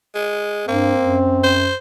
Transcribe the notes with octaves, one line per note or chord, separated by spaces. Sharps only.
G#3
G2 A#3 C4
F#2
C5